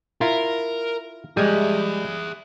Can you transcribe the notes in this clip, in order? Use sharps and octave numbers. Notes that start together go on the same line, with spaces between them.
E4 F4 A#4
G3 G#3 G#4 E5